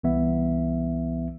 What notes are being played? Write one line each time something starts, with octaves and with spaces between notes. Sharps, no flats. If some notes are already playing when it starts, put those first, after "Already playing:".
C2 E3 B3 E5